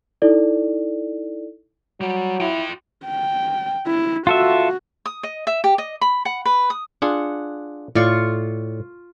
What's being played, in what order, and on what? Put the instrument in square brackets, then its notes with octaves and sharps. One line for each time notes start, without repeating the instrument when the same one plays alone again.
[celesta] D#4 E4 A4 D5
[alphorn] F#3 [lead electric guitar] G3
[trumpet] E4 [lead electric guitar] F4 G5
[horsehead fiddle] G5
E4
[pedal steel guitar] F4 A4 E5 [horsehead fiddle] F#4
[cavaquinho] D#6
D#5
E5
G4
D#5
B5
F#5
B4
D#6
[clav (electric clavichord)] D4 F4 G#4 [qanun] F#5
[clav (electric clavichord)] A2 D5 F5 [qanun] F4 C#6